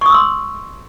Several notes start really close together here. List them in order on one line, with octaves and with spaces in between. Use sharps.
C#6 D#6 E6 C6